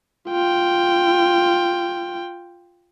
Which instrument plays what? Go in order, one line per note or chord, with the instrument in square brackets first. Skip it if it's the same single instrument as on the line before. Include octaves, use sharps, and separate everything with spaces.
[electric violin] F4 G5